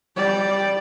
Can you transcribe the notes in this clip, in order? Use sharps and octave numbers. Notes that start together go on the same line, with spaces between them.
G3 D5